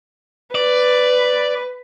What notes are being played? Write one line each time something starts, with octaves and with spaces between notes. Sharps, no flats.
B4 D5